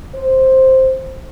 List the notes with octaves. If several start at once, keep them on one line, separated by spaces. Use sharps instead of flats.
C5